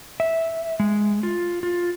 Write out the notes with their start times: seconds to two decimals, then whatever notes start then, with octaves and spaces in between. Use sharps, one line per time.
0.20 E5
0.80 G#3
1.23 F4
1.63 F4